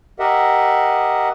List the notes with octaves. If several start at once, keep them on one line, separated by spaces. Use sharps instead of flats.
G4 A#4 D#5 E5 F#5